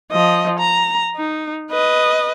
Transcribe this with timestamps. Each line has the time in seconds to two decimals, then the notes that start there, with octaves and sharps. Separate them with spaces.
0.12 F3 D#5
0.59 A#5
1.16 D#4
1.71 B4 D#5